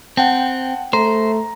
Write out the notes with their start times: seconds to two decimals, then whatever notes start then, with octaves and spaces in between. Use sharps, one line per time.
0.17 C4 F#5 G5 A5
0.93 A3 C5 A#5